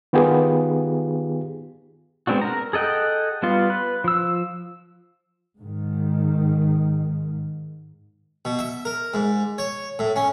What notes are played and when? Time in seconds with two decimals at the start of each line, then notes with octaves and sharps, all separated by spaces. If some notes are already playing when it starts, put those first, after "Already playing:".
0.13 D#3 B3 F4 G4 G#4
2.27 G#3 B3 C4 D4 F#4
2.41 A#4 A#5
2.73 G#4 A4 D#5 F#5 G5
3.43 G3 B3 F4
3.70 B4
4.04 F3 E6
5.58 G#2 D#3
8.45 B2
8.59 E5
8.85 A#4
9.14 G#2
9.58 C#5
9.99 A2
10.16 C#4